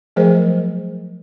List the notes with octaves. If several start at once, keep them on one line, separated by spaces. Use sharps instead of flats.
F3 F#3 A3 G#4 A#4 C5